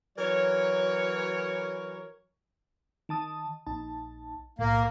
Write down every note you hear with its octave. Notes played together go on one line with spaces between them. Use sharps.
E3 F#3 A#4 C#5
D#3 A5 D#6
A#1 D#4 A5
B1 A2 A#3